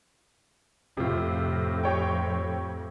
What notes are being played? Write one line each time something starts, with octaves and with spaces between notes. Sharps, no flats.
F2 A2 C3 F4
G4 C#5 G5